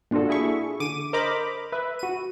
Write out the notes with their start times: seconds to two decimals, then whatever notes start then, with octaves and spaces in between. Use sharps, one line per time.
0.11 A#2 D4 F4 F#4 A4
0.29 E4 G#4 E5 C#6
0.80 D3 D6 D#7
1.13 A#4 C5 D#5 A#5 B5 D6
1.72 B4 E5
1.99 F#4 D#7